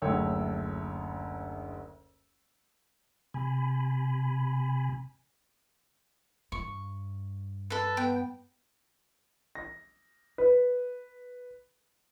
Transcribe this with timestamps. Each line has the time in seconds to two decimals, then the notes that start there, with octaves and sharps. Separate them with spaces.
0.02 F#1 D2 A3 C#5 G5 E6
3.34 C3 G#5 B5
6.52 G2 C#6
7.70 A4 B4
7.97 B3 G5
9.55 A#6
10.38 B4